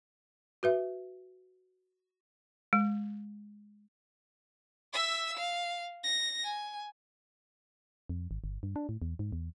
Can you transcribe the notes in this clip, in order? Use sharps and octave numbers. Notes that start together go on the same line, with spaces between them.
F#4 B4 E5
G#3
E5 E6
F5
A#6
G#5
F2
G#1
G1
G2
D4
A2
E2
G#2
E2